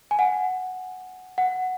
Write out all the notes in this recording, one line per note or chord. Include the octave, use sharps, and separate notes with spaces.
G#5
F#5
F#5